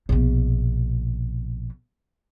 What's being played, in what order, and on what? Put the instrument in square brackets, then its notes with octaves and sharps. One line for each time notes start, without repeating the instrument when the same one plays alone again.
[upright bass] A#1 B2